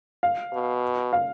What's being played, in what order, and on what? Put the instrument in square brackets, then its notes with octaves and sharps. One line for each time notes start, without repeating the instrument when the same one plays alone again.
[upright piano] F5
[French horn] B2
[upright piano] F5